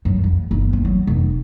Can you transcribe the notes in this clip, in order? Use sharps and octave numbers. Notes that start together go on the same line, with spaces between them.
F#2
F2
G1
A3
F#3
F1